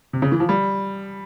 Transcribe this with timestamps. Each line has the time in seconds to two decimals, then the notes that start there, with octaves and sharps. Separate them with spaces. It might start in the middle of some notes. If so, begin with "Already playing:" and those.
0.13 C3
0.22 C#3
0.32 E3
0.40 F3
0.49 G3